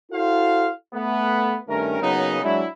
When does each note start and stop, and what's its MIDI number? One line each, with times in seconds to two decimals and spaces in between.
0.12 0.70 64
0.12 0.70 66
0.12 0.70 69
0.12 0.70 72
0.12 0.70 77
0.94 1.57 57
0.94 1.57 59
1.69 1.98 43
1.69 1.98 51
1.69 1.98 57
1.69 1.98 61
1.69 1.98 70
2.01 2.42 49
2.01 2.42 54
2.01 2.42 58
2.01 2.42 59
2.01 2.42 61
2.01 2.42 63
2.43 2.66 54
2.43 2.66 56
2.43 2.66 62
2.43 2.66 64